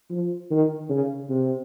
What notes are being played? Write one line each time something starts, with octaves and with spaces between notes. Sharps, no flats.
F3
D#3
C#3
C3